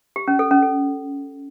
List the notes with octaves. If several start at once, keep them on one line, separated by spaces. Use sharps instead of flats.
G4
C#4
A4
C#4
A4